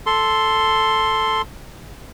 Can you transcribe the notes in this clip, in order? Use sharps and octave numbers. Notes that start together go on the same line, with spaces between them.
A4 C6